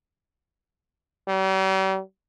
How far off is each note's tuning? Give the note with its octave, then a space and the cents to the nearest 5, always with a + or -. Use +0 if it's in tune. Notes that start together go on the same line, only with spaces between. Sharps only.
G3 -45